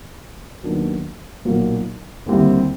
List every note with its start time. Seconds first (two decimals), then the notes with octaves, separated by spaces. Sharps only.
0.63 D#2 D#3 F#3 B3 D4
1.45 B1 A#2 F#3 A#3
2.26 D#2 D3 G3 C4 E4